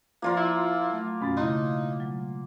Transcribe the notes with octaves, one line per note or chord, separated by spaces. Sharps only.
F3 A#3 F4 A#4 D5 C6
E4
F#3 A3
F#2 B2 B5 A6
C#3 A3 D#4 E4 C6
F#3 G#3